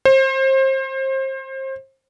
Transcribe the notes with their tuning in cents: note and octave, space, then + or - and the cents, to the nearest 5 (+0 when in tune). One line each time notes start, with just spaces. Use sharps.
C5 +30